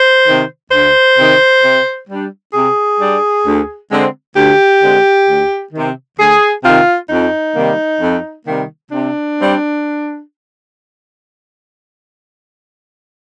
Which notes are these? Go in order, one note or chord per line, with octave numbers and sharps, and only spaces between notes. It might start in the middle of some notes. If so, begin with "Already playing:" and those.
Already playing: C5
C3 D#3
D2 C5
C3 D#3
C3
G3 D4
C3 G#4
G3 D4
D2
D3 G#3 C4
D2 G4
D3 G#3 C4
D2
C3 D#3
D2 G#4
C3 D#3 F4
F2 D#4
C3 D#3 G3 A#3
F2
C3 D#3 G3 A#3
C3 D4
G3 C4